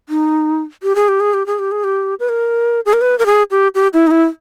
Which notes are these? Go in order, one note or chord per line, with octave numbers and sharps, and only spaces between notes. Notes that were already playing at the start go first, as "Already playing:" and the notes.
D#4
G4
G#4
G4
G#4
G4
G#4
G4
G#4
G4
B4
A#4
G#4
A#4
B4
A#4
G#4
G4
G4
E4
D#4
E4